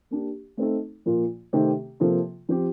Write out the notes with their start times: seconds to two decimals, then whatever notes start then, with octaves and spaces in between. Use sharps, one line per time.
0.11 A#3 D4 G4
0.57 A3 C4 D#4 A4
1.06 A#2 F3 A#3 F4
1.53 C3 D#3 A3 C4 G4
2.00 C3 F3 A#3 F4 A4
2.49 F3 C4 G4